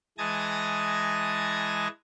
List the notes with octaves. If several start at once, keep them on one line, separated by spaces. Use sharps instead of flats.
E3 G#3 A5 D#6 G#6 A#6